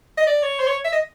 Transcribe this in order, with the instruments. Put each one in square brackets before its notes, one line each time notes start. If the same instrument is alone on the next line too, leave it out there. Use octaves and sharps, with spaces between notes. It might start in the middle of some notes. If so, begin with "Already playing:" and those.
[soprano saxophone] D#5
D5
C#5
C5
C#5
E5
D#5